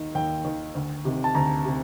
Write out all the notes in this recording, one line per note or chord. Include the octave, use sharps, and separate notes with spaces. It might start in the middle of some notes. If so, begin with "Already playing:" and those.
Already playing: D#2 D#3
D#2 G5
D#3
D2
C3 D#3
A5
D2 A#5
C3